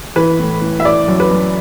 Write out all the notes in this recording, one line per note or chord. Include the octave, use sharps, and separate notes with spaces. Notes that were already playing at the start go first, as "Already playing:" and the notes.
E3 B4
A2
A2
E5
E3 D5
F#2
B4
F#2